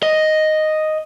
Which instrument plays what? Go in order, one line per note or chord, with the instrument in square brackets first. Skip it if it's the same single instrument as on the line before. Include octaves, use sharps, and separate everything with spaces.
[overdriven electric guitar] D#5